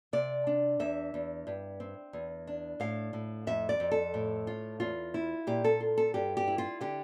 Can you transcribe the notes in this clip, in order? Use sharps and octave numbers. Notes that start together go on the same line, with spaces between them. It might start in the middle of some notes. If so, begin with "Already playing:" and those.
C3 D5
D4
E2 E5
E2
G2
C4
E2
D4
A2 F5
A2
F2 E5
D5
F2
A4
A2
F4
E2 F4
E4
A#2 G4
A4
F4
A4
G2 G4
G4
E4
F4
D3 G4